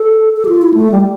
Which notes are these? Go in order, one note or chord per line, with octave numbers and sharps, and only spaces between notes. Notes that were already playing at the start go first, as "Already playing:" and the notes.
Already playing: A4
A4
G4
F4
E4
A3
G3